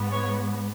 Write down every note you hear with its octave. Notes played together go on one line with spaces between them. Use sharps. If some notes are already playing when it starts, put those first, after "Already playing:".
Already playing: G#2 G#3 B3
C#5